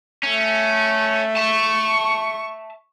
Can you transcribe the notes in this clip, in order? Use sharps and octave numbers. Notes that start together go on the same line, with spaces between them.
A3 C#4
E5 A5 C#6